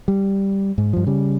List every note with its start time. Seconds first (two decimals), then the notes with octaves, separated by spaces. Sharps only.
0.08 G3
0.78 G#2
0.93 G2 F3
1.07 C#3 G3